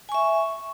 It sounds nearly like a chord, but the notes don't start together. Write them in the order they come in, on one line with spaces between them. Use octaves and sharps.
G#5 C#6 E5